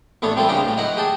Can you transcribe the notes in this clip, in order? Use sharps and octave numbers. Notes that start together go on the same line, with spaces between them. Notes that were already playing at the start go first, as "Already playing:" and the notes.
A1 A3 B3 D4 A4 C#5
G3 C4 E4 F4 A4
C#2 C#3 D4 G4 A#5
A2 F#3
F#3 D#4 E4 F#5 A#5
G4 G#4 G5 A5